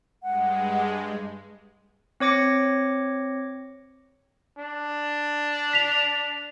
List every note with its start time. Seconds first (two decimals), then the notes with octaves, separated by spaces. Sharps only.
0.23 G2 G#3 F#5
2.20 C4 C#5 D6 A#6 C#7
4.58 D4
5.73 B6 F7